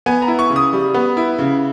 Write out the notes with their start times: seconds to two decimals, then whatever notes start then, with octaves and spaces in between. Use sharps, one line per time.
0.06 B3 G#5
0.22 A#5
0.28 E4
0.39 C#6
0.50 C#3
0.56 D#6
0.73 G3
0.94 B3
1.17 E4
1.38 C#3